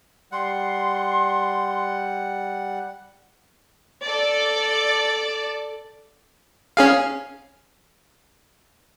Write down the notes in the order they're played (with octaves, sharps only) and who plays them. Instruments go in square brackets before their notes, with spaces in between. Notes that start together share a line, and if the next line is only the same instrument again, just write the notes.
[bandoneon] G3 F#5 [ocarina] C6
[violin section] A4 D5
[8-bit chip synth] C#4 G#4 F5